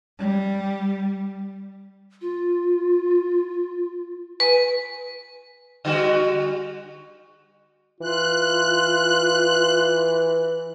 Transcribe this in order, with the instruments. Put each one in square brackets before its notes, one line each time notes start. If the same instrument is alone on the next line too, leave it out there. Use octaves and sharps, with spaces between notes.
[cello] G3
[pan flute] F4
[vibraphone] B4 [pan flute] G#5
[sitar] D3 G3 F#4
[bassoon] E3 [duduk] F4 [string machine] F#6